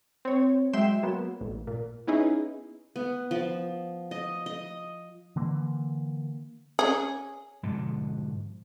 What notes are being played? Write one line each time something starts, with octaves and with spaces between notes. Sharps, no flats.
C4 C#5
F#3 G#3 E5 G5 C6 E7
F#3 A#3 B3
A1
A#2
B3 C#4 D#4 E4 G#4
B3
F3
D#5
D#5
D3 E3 A#3
C#4 G#4
G#2 B2 D3 F3